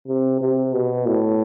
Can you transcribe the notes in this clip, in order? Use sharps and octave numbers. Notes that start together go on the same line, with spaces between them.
C3
C3
B2
A2